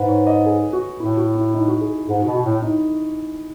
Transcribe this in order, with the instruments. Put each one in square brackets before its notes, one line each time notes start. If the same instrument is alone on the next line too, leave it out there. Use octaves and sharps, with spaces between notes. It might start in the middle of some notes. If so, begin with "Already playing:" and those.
Already playing: [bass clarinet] G#2 [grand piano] B4
[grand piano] C#5
D#5
G#4
F#4
[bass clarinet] A2 [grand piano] E4
[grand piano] F#4
E4
D#4
F#4
G#4
[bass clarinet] G#2 [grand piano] G#4
[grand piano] F#4
[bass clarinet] B2
[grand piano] F#4
[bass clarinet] A2 [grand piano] E4
[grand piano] D#4